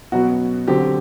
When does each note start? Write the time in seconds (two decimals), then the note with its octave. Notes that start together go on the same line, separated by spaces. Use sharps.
0.12 B2 F#3 B3 F#4
0.68 D3 F#3 C4 G4